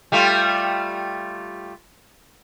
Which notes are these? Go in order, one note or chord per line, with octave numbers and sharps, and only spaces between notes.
G3 A3 F4